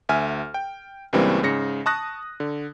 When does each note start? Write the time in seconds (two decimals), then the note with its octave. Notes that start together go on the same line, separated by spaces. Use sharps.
0.09 D2 E5 G#5 F6
0.54 G5
1.13 C#2 G2 E3 G3 A#3 C4
1.43 G#2 C#3 A#6 C#7
1.86 A5 C#6 D#6 F#6 A#6
2.40 D3